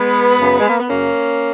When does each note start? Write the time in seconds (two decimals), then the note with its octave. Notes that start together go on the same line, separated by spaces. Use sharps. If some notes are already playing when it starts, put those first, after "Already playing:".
Already playing: G#3 B3
0.39 F#2 C#3
0.60 G#3
0.69 A#3
0.79 B3
0.89 F#2 C#3 A#3 C#4